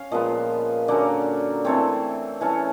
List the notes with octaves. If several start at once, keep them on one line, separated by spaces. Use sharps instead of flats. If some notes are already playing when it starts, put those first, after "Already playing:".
Already playing: C#4 C#5 F5
A#2 F3 G#3 B3 D#5
D3 F#3 A#3 C#4 D5
E3 A3 C4 C#5
E3 A3 C#4